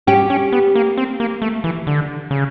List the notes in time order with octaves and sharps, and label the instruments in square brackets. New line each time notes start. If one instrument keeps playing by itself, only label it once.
[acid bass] C#4 [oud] G4
[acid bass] C#4
B3
A#3
C4
A#3
A3
E3
D3
C#3